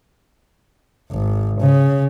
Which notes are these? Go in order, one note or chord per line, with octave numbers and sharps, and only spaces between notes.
G#1
C#3